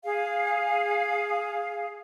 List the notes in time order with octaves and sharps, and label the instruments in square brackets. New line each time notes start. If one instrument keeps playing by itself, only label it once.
[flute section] G#4 F5